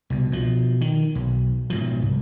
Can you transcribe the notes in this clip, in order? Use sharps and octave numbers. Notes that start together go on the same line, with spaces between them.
C2 B2
B2 F3
D#3
B1
G#2 B2 F3
C2